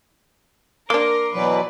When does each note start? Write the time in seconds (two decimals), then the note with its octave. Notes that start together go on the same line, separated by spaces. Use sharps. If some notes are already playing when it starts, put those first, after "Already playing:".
0.90 A#3 D4 A#4 C6 D6
1.33 B2 E3 F#3 B4 D5